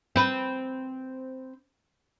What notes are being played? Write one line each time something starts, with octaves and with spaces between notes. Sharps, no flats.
C4 B4